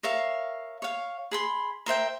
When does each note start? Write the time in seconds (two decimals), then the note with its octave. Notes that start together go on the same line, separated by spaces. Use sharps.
0.03 A#4 C#5 E5 F5
0.82 C#5 F5
1.31 G#4 B5 C6
1.86 A#4 C5 E5 G5